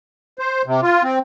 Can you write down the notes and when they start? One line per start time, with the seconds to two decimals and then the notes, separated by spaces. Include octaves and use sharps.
0.39 C5
0.66 C3
0.83 F4
1.03 C4